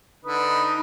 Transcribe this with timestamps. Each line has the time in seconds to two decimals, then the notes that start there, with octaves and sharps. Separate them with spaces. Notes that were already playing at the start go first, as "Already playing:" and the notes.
0.24 D3 D#4 B4 D#6